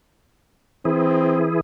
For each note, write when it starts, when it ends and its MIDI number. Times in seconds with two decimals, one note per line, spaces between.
0.85 1.61 52
0.85 1.48 60
0.85 1.61 64
0.85 1.61 68